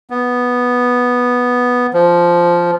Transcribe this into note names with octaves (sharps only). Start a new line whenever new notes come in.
B3
F3